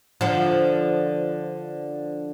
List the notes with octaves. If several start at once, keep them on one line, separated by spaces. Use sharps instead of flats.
D3 F3